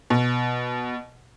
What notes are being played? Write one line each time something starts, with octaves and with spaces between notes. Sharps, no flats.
B2